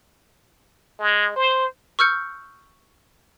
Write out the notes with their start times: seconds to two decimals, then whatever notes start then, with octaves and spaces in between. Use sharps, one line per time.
0.99 G#3
1.36 C5
1.99 C#6 E6 F6 G6 C#7